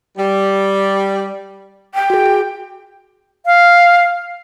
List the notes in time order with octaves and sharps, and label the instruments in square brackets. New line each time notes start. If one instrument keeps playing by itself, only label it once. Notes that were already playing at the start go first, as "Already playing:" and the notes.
[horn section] G3
[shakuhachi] G5
[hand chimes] F#4 G#4
G#4
[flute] F5